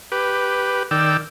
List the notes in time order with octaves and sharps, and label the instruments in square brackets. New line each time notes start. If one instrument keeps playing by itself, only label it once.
[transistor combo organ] G4 B4
D#3 D5 G5 E6